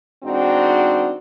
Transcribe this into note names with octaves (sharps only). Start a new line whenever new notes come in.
E2 G#2 C4 D4 D#4 F#4